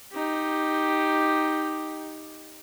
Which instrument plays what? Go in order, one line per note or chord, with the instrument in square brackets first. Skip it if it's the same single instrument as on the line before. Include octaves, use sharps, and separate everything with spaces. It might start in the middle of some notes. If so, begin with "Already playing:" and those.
[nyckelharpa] D#4 G4